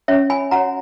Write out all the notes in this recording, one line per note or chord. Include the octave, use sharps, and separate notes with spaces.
C#4 C#5 E5
G#5 B5
F#4 C#5 F#5 A#5